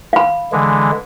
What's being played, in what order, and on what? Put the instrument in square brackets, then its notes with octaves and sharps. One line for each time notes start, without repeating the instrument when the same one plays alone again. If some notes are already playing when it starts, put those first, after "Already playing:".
[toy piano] F5 B5
[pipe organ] D3 E3 G#3